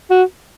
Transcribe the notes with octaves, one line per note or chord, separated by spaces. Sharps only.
F#4